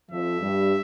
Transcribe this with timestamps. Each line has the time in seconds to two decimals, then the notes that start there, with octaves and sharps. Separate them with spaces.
0.11 F2 F3 E5
0.41 G2 G3